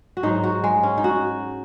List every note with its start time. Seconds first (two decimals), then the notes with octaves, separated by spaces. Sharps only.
0.17 F#4
0.23 G#2 F#3 D#4
0.44 F#4
0.64 G#3
0.83 C#4
0.98 D#4
1.04 F#4